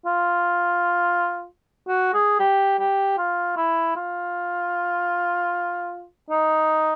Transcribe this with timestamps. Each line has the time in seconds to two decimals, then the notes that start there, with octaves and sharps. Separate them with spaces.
0.06 F4
1.88 F#4
2.14 G#4
2.40 G4
2.79 G4
3.18 F4
3.56 E4
3.96 F4
6.30 D#4